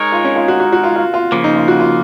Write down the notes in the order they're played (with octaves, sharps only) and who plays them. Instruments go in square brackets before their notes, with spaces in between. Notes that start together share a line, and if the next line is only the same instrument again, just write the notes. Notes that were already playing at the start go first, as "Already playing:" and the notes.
Already playing: [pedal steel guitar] G#3 D#4 A#4 C#5
[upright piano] F4
C#4
F4
F#4
F#4
F#4
F4
F4
F4
[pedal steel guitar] C#3 F3 A#3
[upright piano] D#4
F4
F#4
F4